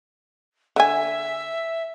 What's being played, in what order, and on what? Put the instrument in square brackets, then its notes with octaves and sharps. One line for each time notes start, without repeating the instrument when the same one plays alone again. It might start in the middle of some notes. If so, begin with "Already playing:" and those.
[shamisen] D3 G#5 [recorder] E5